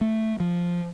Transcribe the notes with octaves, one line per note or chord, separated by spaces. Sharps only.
A3
F3